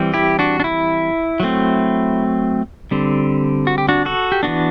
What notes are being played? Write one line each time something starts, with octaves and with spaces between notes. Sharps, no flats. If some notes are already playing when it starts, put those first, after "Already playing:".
Already playing: E3 G3 C4
E4 G4
D4 F#4
D4
E4
F#3 A3 C4
D3 G3 C4
F#4
G4
D4 F#4
F#4 A4
G4
E3 B3 D4 F#4